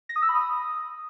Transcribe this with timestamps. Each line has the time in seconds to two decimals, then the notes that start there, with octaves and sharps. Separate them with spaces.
0.09 A#6
0.16 D#6
0.22 E6
0.29 B5
0.35 D#6